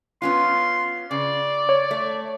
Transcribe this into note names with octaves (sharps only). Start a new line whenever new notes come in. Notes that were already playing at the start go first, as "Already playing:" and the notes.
B3 C#4 F4 C6
C#3 D5
C#5
A3